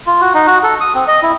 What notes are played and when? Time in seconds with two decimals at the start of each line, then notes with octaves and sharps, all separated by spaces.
0.07 F4
0.21 F#4
0.34 D#4
0.47 F#4
0.63 A4
0.81 D#6
0.95 C4
1.08 D#5
1.23 E4